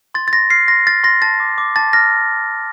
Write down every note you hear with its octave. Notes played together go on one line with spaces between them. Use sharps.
C6 A6
A6
C6 A#6
F6 C7
C6 A#6
F6 A6
C6 A#6
A5 A6
D6
D6
A5 A6
F6 A#6